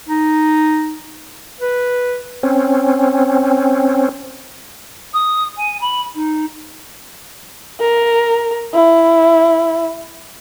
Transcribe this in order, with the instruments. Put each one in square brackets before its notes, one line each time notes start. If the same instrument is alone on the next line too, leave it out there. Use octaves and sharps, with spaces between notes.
[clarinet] D#4
B4
[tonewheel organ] C4 C#4
[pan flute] D#6
G#5
B5
D#4
[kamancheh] A#4
E4